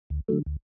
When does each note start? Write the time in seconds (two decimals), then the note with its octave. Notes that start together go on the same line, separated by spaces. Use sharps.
0.10 D2
0.28 D3 F#3 A3
0.46 D2